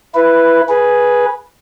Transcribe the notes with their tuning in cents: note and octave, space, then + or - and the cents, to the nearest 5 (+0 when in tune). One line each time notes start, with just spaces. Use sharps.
E4 +15 B4 +0
G#4 +0 B4 -15